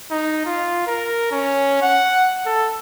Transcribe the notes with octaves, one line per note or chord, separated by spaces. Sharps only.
D#4
F4
A#4
C#4
F#5
A4